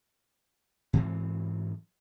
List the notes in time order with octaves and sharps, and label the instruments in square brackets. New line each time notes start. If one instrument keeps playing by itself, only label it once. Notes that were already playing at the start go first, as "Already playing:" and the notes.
[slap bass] G#2 E3 F#3 C4